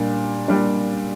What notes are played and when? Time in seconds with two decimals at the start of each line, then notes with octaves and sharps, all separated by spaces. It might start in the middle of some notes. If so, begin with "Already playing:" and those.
Already playing: A#2 G3 D4
0.48 A#2 G3 D4